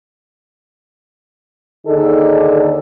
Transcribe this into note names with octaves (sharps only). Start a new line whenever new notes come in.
D#2 D3 D#4 G#4 A4